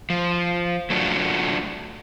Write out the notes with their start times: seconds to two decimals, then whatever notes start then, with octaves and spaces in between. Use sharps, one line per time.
0.10 F3
0.90 F#3 A3 D4 D#4 F4 F#4